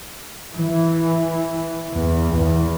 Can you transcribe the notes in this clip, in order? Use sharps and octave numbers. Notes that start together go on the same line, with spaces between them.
E3
E2
E2